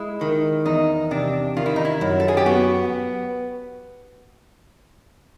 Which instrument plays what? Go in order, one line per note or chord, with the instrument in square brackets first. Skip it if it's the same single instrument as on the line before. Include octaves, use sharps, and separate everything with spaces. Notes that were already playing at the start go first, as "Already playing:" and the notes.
Already playing: [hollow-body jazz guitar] G#3 [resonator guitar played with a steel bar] E4
[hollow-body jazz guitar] D#3
[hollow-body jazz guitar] E2 [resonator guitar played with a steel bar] D#4
[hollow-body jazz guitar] C3 [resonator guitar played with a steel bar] D4
[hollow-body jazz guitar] D#3 [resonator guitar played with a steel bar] F4
[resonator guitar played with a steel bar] E4
D#4
E4
[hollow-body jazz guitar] F#2
[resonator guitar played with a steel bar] A4
G#4
G4
[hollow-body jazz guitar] B3 [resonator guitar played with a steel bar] F#4